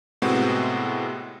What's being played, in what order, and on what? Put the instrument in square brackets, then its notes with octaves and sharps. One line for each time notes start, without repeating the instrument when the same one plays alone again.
[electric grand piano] A2 C3 G#3 B3 C4 F#4